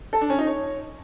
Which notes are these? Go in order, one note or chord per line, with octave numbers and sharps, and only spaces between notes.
A4
D4
C#4
D#4
C#5